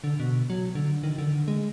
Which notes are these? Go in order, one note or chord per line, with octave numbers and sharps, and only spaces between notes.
D3
B2
F#3
D3
D#3
D3
G#3